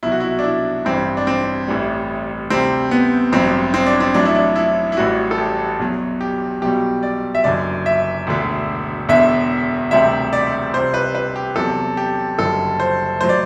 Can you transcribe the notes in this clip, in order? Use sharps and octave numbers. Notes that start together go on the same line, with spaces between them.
C2 B2 F#3 E4
F#4
E4
D4
E4
A1 G2 E3 G3 C4
D4
C4
A1 A2 E3 G3
D2 C3 G3 C4
B3
A1 G2 F#3 C4
C4
D4
C4
A1 A2 F#3 D4
E4
D4
E4
E4
A1 A2 E3 G3 F#4
A4
G4
E2 B2 F#3
G4
B1 B2 G3 G4
D5
E5
F#1 F#2 D3 D5
E5
E1 D2 D3
E1 E2 D3 E5
E1 D2 C3 G3 E5
D5
C2 C3 G3 C5
B4
B4
G4
E2 C3 F#3 A4
G4
F#1 F#2 D3 G3 A4
C5
A2 F#3 C5
D5